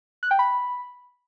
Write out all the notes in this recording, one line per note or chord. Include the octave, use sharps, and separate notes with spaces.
F#6
G5
B5